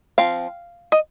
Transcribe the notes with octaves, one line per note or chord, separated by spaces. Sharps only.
F3 C4 F5
D#5